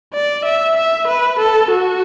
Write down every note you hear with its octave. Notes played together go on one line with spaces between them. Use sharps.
D5
E5
E5
B4
A4
F#4